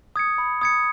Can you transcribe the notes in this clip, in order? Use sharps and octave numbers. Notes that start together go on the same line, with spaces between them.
D#6 G#6 C#7
B5
D#6 G#6 C#7